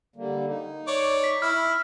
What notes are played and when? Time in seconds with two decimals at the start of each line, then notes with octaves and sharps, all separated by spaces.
0.16 D3 G3 A#3
0.46 D#4
0.88 C#5 D5
1.24 B6
1.42 E4 F6